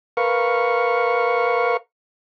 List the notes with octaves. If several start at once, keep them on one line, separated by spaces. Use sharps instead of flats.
A#4 B4 F5 C#6